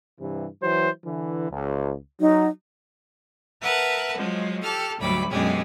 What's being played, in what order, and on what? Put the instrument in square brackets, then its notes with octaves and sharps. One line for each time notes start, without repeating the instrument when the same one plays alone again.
[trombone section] G2 C3 E3
E3 F#3 C5
D3 E3
C#2
[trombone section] F#3 [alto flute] D#4
[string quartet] A#4 B4 E5 F#5 A5
F3 F#3 G#3
G4 A4 A5 F6
D2 G#2 F#3 G3 B5 D6
F#2 B2 G#3 D4 G4 G#4